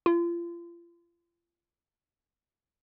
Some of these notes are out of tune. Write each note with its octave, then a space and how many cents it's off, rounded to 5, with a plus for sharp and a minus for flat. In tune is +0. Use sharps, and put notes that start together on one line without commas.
F4 -35